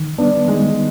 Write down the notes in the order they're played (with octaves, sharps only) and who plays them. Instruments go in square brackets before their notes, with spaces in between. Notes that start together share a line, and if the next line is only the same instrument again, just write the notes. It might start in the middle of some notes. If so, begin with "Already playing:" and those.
Already playing: [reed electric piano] D#3
[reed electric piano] G3 B3 [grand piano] D4
[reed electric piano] D#3 [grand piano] G#3